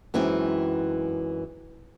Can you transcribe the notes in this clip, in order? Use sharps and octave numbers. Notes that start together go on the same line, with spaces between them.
F#2 E3 G#3 C4 D#4 E4